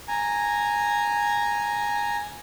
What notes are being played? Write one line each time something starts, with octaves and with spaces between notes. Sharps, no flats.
G#5 A#5